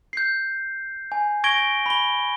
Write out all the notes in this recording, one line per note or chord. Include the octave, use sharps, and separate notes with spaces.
G6 C7
G#5
C#6 G#6 A#6 D7 G7
B5 G7